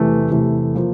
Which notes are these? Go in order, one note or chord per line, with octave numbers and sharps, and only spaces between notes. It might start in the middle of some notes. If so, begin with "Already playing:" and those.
Already playing: E2 C3 E3 A3
E2 C3 E3 A3
F3 A#3